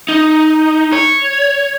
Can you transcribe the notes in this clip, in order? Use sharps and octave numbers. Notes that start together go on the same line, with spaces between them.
D#4
C#5